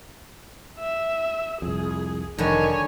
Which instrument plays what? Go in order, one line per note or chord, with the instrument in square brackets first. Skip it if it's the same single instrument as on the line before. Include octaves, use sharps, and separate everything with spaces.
[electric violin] E5
[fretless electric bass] C2 F2 [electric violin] G#4
[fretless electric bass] F1 [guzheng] D3 F#3 G3 [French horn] D#3 [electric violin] C#5 G#5